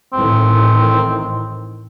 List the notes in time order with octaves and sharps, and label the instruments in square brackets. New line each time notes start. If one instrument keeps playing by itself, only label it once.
[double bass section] A1 A2 D#3 [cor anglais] C4